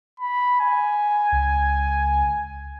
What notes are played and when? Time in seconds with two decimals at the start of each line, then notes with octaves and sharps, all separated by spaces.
0.20 B5
0.61 G#5
1.32 C#2